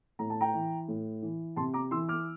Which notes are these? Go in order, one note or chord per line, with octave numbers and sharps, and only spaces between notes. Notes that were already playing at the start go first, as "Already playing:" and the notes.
A2 A#5
A5
G5 A#5
E3
A2
E3
C3 A5 C6
A#5 D6
E3 C6 E6
D6 F6